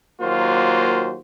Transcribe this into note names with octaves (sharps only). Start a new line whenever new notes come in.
D#2 F#3 A#3 F4 F#4 C5